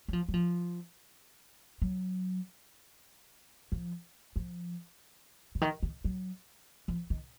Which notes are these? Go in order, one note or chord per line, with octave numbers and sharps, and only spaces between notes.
F#3
F3
F#3
F3
F#3
F3
F3
C#3
D#3
D#3
F#3
F3
D#3